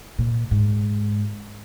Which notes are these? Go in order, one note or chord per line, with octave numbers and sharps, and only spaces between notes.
A#2
G#2